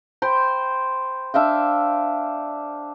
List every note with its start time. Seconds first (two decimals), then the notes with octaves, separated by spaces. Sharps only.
0.22 C5 G5 B5 C6
1.34 D4 E5 F5 G5